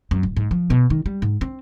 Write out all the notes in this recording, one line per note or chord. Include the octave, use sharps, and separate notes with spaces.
F#2
D1
G#2
F3
B2
D#3
G3
G#2
C4